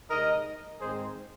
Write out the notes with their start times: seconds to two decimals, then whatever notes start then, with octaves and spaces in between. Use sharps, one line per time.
0.10 C3 G#3 D#4 A#4 D#5
0.80 G#2 D#3 G#3 C4 D#4 G#4 C5